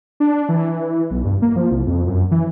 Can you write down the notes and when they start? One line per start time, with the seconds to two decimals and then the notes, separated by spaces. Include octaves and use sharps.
0.20 D4
0.49 E3
1.11 B1
1.25 G2
1.42 A#3
1.56 F3
1.71 C2
1.87 F2
2.07 F#2
2.31 E3